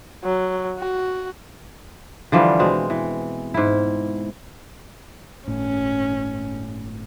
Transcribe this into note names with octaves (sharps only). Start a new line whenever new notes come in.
F#3
F#4
D3 E3 F3 G3
B2 G#3 C4
E3
G#2 E4
G1 A2 C#4